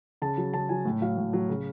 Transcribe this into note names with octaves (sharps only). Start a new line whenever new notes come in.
C#3 A5
F#3
C#3 A5
F#3 G#5
A2
F#3 F5
A2
F#3
C#3